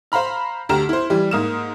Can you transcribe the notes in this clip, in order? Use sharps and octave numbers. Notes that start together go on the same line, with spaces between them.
C5 F5 A#5 B5 F6
D2 G4 A#5 F6 E7
E4 C5
E3 G3
G#2 A#3 D#6 F6 E7